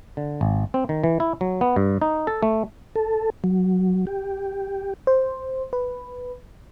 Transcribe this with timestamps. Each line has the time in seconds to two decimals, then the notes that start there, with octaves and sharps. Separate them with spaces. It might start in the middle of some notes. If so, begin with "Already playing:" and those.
0.17 D3
0.41 G#1
0.74 C4
0.89 D#3
1.04 E3
1.20 E4
1.41 F#3
1.61 B3
1.76 G2
2.02 D#4
2.27 A4
2.43 A3
2.96 A4
3.44 F#3
4.07 G4
5.07 C5
5.73 B4